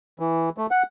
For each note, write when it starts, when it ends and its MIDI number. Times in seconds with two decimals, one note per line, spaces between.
0.19 0.49 52
0.58 0.66 57
0.71 0.83 78